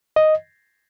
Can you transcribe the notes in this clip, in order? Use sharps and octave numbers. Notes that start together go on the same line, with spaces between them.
D#5